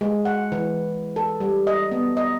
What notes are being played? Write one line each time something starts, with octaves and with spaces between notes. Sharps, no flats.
G#3
F#5
E3
A4
G3
D#5
B3
D#5